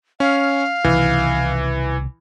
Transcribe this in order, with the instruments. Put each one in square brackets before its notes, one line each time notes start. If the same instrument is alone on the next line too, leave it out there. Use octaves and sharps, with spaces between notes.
[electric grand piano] C#4 [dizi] F5
[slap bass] C2 B2 D#3 [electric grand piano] E3